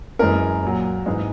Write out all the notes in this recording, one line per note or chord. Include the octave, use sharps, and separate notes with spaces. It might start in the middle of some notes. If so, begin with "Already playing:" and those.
F#2 E3 G#3 A#4
A#2 F#3
G#2 E3 G#3